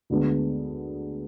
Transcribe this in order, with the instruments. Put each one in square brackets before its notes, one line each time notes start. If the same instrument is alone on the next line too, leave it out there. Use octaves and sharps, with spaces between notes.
[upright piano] D2 D3 G#3 B3